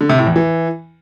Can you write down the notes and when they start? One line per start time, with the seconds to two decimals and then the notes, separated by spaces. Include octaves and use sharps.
0.01 D3
0.09 C3
0.18 A2
0.27 E2
0.36 E3